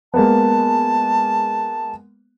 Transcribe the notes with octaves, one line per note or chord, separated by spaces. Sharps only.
G#3 A#3 B3 A5